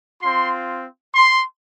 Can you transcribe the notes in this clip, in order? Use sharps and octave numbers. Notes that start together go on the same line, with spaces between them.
C4 F4 C6
C6